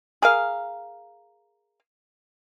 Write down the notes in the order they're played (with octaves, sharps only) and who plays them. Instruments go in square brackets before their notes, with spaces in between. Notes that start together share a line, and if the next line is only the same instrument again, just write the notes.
[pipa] G#4 A#4 F5